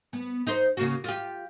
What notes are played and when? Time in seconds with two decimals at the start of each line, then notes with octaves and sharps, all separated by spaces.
0.13 B3
0.47 D#4 C5
0.77 C#3 A#3 F#4
1.04 F4 G4